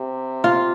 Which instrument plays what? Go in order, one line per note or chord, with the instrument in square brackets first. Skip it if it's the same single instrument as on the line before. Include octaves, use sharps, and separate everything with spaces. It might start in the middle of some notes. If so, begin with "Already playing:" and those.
Already playing: [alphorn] C3
[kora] F4